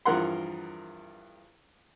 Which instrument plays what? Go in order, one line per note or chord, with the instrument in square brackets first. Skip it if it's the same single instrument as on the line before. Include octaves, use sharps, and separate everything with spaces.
[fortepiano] E2 G2 F3 A#4 F#5 C6